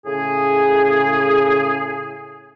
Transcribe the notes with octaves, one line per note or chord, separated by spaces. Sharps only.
A2 C#3 G#4